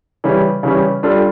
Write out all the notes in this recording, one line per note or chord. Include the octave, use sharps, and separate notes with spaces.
C#3 E3 G3 C#4
C#3 E3 G3 C#4
G3 D4 F4 A4